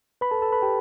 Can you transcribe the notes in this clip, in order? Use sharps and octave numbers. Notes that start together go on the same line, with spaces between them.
B4 B5
A4 A5
A4 A5
B4 B5
G4 G5